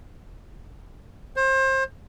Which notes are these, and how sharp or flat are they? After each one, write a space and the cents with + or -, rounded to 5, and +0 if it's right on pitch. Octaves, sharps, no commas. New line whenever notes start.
C5 +30